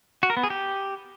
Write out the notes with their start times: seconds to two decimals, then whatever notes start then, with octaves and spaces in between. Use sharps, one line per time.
0.23 F#4
0.30 A#4
0.37 B3
0.43 G#4
0.50 G4